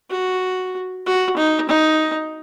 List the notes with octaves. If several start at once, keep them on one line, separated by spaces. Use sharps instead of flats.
F#4
F#4
D#4
D#4